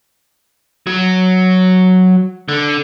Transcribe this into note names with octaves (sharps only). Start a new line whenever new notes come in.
F#3
D3